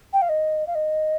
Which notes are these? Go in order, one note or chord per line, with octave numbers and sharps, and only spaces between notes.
G5
F5
D#5
F5
D#5